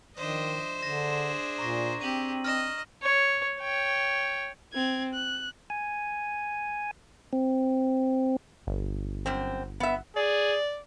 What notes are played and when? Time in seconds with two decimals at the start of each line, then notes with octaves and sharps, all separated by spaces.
0.17 D#3 F3 D4 C5 D#5 E5
0.83 D3 D4 G#4 A#6
1.59 A#2 A#5 C#6 A#6
2.01 C4 G4 D#7 F#7
2.44 D#5 F6 A#6 E7
3.02 C#5
3.60 C#5 G5
4.73 C4 G#6
5.14 F#6
5.70 G#5
7.33 C4
8.67 G1
9.26 F#2 C4
9.80 B3 E5
10.16 G#4 D5